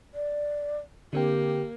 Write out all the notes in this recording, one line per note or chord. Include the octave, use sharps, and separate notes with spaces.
D5
D3 A#3 C4 G4 G5